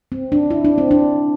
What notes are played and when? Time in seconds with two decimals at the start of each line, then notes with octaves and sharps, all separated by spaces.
0.12 C4
0.32 D4
0.51 E4
0.65 D4
0.78 C4
0.91 D4